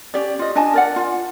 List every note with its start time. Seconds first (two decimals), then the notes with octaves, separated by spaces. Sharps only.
0.14 C#4 G4 D5
0.39 F4 D#5
0.55 D4 D#5 G#5 A5
0.74 A#4 D5 F#5
0.96 F4